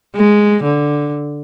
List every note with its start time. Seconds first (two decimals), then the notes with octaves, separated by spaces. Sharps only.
0.16 G#3
0.63 D3